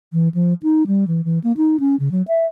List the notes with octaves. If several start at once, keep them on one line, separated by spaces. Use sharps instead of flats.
E3
F3
D#4
G3
E3
E3
A#3
D#4
C#4
C#3
F#3
E5